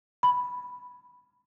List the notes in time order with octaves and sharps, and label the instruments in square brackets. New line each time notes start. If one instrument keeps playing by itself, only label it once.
[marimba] B5